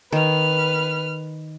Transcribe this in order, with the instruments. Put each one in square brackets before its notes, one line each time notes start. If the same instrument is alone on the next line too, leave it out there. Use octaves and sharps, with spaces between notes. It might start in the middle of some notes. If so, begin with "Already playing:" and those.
[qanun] D#3 [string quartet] B4 F6